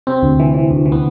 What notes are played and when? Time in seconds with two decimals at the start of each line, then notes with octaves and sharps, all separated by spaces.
0.07 C3 C4
0.23 D2
0.40 E3
0.54 E3
0.71 D2
0.86 E3
0.92 B3